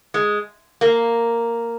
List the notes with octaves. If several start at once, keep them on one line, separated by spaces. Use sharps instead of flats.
G#3
A#3